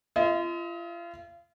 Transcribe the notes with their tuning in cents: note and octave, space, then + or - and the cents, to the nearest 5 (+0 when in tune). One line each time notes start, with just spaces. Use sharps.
F4 -35 D#5 +35